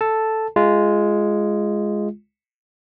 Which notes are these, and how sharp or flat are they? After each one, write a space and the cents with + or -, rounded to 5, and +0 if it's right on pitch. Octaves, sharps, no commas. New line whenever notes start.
A4 +0 A5 +0
G#3 +0 F4 -15